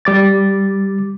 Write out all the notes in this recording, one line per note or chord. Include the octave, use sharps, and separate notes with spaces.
G3 D6 A6